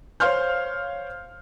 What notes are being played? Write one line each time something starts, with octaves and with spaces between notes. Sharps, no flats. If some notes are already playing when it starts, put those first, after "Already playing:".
C5 C#5 F5 C6 F6 G6